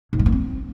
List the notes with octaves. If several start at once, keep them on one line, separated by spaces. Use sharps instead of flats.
G#2
G#3
A#3
C4